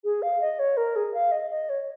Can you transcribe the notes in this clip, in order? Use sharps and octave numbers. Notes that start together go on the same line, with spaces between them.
G#4
F5
D#5
C#5
A#4
G#4
F5
D#5
D#5
C#5